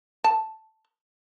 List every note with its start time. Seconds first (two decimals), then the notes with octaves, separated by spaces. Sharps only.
0.24 A5